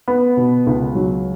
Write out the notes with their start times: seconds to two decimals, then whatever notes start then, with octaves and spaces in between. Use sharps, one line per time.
0.08 B3
0.37 B2
0.67 C#2
0.95 F#3